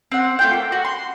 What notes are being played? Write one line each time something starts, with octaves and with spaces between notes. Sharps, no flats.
C4 F#5
A3 F4 G5
A#3
F#4
C6